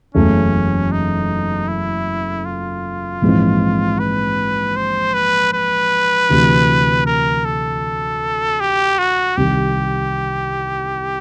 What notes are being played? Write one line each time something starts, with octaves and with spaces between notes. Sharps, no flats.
F#1 E2 C#3 E3 A3 C#4
D#4
E4
F4
A#1 G#2 E3 G#3 C4
B4
C5
B4
B4
D2 C3 E3
A#4
A4
G4
F#4
C2 C3 D#3 G4